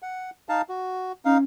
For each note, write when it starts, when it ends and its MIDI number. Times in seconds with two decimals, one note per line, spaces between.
0.02 0.30 78
0.49 0.62 63
0.49 0.62 77
0.49 0.62 81
0.69 1.12 66
1.25 1.44 61
1.25 1.38 63
1.25 1.38 77